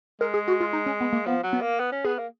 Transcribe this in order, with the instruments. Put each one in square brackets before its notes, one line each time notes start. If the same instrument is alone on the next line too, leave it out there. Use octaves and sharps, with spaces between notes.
[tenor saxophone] G#3 [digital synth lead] A#4
[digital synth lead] G#4
F#4
F4
D#4
C#4
B3
A#3
[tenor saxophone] F3 [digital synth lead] B3
[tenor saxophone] F#3
[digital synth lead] B3
[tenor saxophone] A#3
B3
C#4
[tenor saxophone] B3 [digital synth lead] G#4
[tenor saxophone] A#3